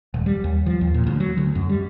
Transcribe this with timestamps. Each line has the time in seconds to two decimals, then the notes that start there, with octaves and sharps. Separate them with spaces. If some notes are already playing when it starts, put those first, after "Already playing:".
0.14 D#1
0.26 G3
0.44 D#2
0.66 F3
0.81 D#2
0.94 A#2
1.07 D2
1.20 F#3
1.38 D2
1.55 F#2
1.69 G3